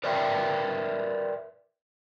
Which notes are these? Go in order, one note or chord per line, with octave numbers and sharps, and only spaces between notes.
A#4 B4 D5 E5 F5 G5